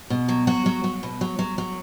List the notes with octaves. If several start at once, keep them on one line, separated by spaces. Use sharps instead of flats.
B2
F#3
F#3 F#4
F#3
F#3
B2
F#3
F#3
F#3